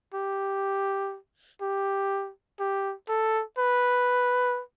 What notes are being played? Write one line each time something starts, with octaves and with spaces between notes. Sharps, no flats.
G4
G4
G4
A4
B4